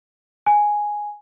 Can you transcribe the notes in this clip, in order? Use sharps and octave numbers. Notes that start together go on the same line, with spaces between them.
G#5